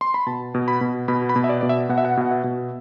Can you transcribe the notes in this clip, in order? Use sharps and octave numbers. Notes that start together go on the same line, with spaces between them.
C6
B5
B2 A5
B2
B5
B2
B2 B5
B5
B2
E5
D5
B2 D5
E5
B2 F#5
E5
F#5
B2 F#5
E5
B2